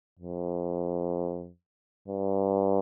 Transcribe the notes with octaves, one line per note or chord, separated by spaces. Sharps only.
F2
G2